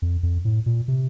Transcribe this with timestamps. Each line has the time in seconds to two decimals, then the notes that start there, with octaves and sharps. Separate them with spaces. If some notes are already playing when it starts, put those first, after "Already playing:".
0.02 F2
0.23 F2
0.45 A2
0.66 A#2
0.88 C3